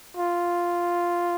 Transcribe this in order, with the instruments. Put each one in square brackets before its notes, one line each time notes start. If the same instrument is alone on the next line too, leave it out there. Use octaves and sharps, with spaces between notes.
[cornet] F4